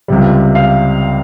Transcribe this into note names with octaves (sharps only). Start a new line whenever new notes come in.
C#2 C3 G3
F5